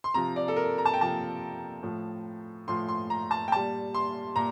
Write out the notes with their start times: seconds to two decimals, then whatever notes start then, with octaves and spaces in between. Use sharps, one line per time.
0.04 C6
0.14 C3 F3 A#5
0.36 D5
0.48 A4
0.56 A#4
0.78 A#5
0.85 A5
0.94 G5
0.99 C3 F3 A5
1.83 A2 F3
2.68 A2 F3 C6
2.88 C6
3.10 A#5
3.31 A5
3.48 G5
3.52 A#2 G3 A5
3.95 C6
4.36 A#2 A#5